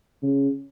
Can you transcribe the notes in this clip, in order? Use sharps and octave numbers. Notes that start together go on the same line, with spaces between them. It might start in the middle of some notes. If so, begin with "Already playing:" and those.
C#3